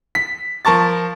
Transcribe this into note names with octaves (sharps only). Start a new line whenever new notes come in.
B6
F3 A#4 A5 C#6 A6